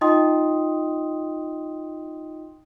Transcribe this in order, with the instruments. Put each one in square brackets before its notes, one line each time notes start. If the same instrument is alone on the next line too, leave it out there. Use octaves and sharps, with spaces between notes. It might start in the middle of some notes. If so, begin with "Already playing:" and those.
[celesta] D#4 F4 D#5 G5 C6 D#6